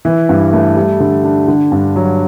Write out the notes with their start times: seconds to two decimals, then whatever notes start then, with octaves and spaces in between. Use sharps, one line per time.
0.05 E3
0.29 G2
0.53 A3
0.77 G3
1.00 D3
1.24 D4
1.48 D3
1.72 G2
1.96 F#3